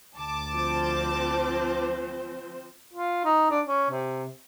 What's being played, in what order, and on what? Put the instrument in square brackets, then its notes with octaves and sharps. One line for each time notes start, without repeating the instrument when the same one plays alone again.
[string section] D2 A5 D6
[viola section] F3 C4 C5
[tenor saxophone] F4
D#4
D4
C#4
C3